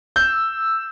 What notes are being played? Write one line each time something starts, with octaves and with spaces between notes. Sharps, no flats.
E6 G6